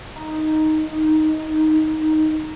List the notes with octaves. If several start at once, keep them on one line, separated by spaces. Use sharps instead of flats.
D#4